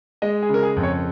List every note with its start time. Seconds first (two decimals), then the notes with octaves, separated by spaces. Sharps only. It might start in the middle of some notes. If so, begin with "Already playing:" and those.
0.22 G#3 D#5
0.42 G#4
0.49 C#3 A#4
0.63 G#4
0.76 F2
0.83 C#5